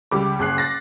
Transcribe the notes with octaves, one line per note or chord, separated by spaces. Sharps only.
C#2 G3 D6
F#1 G#4 F#6 C7
A6 A#6